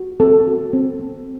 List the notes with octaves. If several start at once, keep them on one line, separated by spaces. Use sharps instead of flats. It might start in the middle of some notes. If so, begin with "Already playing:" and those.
Already playing: F#4
C4 A4
F#4
C4
C4